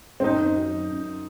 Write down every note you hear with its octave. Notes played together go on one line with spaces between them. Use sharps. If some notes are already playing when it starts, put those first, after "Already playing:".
C4
F#2 D#4
F#3
F#2